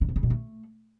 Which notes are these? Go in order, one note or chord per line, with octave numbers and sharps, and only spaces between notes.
C#3
C3
C#3
B2
A3